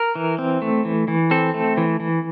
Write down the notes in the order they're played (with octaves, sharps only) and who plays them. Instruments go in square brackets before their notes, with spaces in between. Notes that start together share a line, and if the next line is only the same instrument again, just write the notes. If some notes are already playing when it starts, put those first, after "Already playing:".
Already playing: [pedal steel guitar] A#4
E3
C4
A3
E3
E3
C4 A4
A3
E3
E3